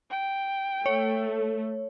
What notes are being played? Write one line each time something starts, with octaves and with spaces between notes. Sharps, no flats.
G5
A3 C#5